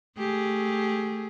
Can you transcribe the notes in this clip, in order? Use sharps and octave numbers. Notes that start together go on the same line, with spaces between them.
A3 G4 G#4